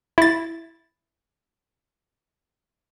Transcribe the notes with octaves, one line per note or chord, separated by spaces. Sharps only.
E4 A6